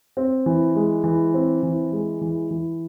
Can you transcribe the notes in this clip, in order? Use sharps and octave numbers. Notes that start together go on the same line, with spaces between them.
C4
E3
G#3
E3
C4
E3
G#3
E3
E3